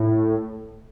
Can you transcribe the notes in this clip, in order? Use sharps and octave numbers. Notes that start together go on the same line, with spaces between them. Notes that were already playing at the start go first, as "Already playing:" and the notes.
Already playing: A2